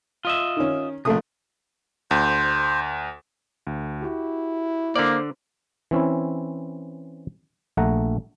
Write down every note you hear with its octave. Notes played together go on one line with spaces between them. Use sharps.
F4 D#5 E5
D#3 C#4
A#1 C3 A3 D#6
D2 C5
D2
E4 F#4 G4
D3 A#3 C5 D5
E3 C4 C#4 E4
A#1 A3 F#5 A#5